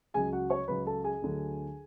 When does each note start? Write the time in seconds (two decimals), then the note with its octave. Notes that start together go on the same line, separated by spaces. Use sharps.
0.14 C#2 C#3 F#3 G#4 G#5
0.33 F#4 F#5
0.50 C#5 C#6
0.68 C#2 C#3 F#3 B4 B5
0.86 A4 A5
1.04 G#4 G#5
1.22 D2 D3 F#3